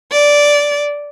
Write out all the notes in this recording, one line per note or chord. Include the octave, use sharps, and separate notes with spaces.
D5